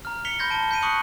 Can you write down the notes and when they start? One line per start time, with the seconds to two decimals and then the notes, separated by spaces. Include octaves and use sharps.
0.05 A#5 F6
0.25 B6 C#7 F7 G7
0.39 B5 C6 G6 G#6 A#6 G7
0.50 A5 D7 G7
0.71 G6 B6 D7 D#7
0.82 C#6 D#6 F#6 C#7 F#7